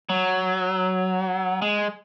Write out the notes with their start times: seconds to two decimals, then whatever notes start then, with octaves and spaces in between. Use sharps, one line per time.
0.10 F#3
1.62 G#3